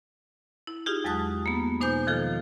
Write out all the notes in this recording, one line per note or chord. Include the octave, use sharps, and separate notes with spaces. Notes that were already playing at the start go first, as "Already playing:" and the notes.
E4
D#4 F4 G4 G#4
E2 F#3 G#3 A5 D#6 F#6
A#3 B3
B2 D#4 C5 G#5 D6 G6
D#3 F3 F4 A4